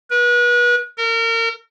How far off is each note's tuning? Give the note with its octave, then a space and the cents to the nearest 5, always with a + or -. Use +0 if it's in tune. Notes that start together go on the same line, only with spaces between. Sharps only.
B4 -35
A#4 -30